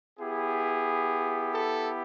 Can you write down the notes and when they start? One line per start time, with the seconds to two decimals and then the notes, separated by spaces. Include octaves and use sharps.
0.20 B3 E4 G4 G#4
1.54 A4